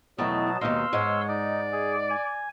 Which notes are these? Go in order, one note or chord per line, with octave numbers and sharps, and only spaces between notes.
E2 B2 D#3 F#3 A3 D#5 A5
D#2 B2 G#3 D#4 F5 C6 E6
G#2 G#3 C5 C#5
D#4 D5
G#4
G#5